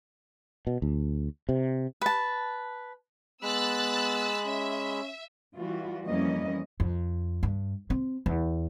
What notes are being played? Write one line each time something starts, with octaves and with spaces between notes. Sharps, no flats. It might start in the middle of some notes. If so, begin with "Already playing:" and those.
B2
D2
C3
B4 A5
G#3 B3 B5 E6 F#6 A6
C#4 E5
E3 G3 F4 F#4
F2 E3 G3 A#3 C#4 D#5
F2
G2
C4
E2